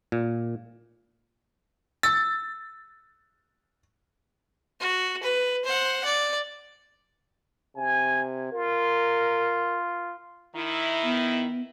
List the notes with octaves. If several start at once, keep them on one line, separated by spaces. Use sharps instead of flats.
A#2
E6 A6
F#4
B4
C5 F#5
D5
C3 G#5
F4 A#4
D#3 E4
B3